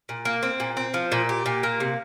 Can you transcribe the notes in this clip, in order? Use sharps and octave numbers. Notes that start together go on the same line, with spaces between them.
A#2
A#3
C4
A#2
C4
F3
A#2
G4
A#2
A#3
C3